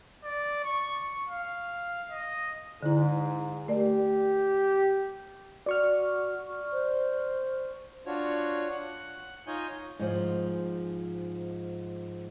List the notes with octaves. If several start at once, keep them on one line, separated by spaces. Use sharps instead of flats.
D5
C#6
F5
D#5
G#2 D3 E4
A3 G4 A#4 D5
F#4 D5 C#6 F6
C5
D4 F4 F#4 C#5
F#5
D#4 F4 C#5 D#5 G#5 G6
G#2 F3